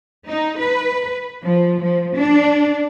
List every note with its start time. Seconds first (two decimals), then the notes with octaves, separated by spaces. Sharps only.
0.27 D#4
0.59 B4
1.42 F3
1.81 F3
2.16 D4